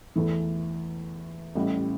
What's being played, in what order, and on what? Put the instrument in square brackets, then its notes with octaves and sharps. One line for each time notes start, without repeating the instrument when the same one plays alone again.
[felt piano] E2 E3 A3
A1 A2 G3